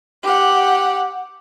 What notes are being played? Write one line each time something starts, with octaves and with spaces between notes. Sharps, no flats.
G4 F#5